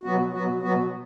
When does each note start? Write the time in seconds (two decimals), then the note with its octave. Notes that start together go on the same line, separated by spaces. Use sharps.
0.04 B2 F#3 B3 F#4
0.33 B2 F#3 B3 F#4
0.62 B2 F#3 B3 F#4